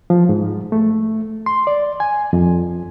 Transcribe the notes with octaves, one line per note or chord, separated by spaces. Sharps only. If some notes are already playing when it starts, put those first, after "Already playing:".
F3
G#2
A3
C6
D5
G#5
F2